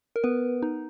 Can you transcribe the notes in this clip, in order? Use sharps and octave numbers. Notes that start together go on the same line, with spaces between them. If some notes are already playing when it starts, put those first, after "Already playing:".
A#4
B3 B4
D#4